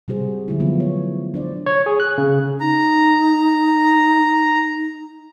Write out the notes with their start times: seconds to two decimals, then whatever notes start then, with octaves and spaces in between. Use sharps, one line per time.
0.08 C3 G3 F#4 G#4 C5
0.48 D3 F3 F#3 G#3 A3 E4
0.60 D3 F#3 B3 F4
0.80 C#5
1.34 D4 C5 D5
1.66 C#5
1.86 G#4
2.00 F#6
2.18 C#3
2.60 D#4 A#5